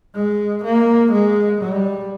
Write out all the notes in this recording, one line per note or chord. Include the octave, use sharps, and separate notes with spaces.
G#3
A#3
G#3
G3